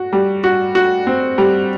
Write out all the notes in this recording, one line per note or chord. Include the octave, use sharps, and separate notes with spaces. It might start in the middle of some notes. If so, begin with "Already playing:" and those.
Already playing: F#4
G3
F#4
F#4
C4
G3